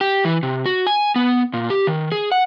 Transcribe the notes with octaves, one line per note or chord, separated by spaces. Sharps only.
G4
E3
C3
F#4
G#5
B3
A#2
G4
D#3
G#4
F#5